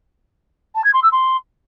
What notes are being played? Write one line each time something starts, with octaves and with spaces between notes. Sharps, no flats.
A5
G#6
C6
E6
C6